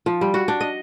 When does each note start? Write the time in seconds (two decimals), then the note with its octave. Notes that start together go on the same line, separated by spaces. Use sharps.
0.06 F3
0.21 G3
0.34 F#4
0.48 D4
0.60 D#5